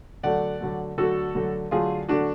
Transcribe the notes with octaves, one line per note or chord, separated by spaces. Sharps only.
D3 F#3 A3 D5 F#5
D3 F#3 A3
D3 F#3 A3 F#4 A4
D3 F#3 A3
D3 F#3 A3 F4 G#4
D3 F#3 A3 D4 F#4